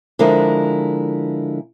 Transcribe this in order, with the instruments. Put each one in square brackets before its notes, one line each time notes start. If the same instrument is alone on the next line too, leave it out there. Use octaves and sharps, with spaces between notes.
[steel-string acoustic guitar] D3 F3 G#3 E4 A#4